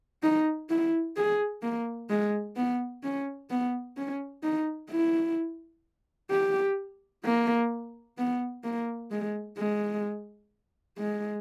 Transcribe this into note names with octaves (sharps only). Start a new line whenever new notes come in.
D#4
E4
G#4
A#3
G#3
B3
C#4
B3
C#4
D#4
E4
G4
A#3
B3
A#3
G#3
G#3
G#3